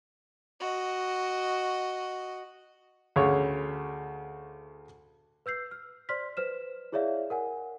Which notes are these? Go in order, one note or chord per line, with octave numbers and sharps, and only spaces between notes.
F#4 D#5
D2 C#3 C#5
B4 E6 G6 C7
F6
C5 D5 C6 F6 B6
B4 C5 F6 E7
E4 G#4 C#5 D5 E5 F5
A#4 F#5 G#5